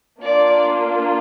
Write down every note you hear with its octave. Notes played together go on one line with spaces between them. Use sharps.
A#3 D4 F4 D5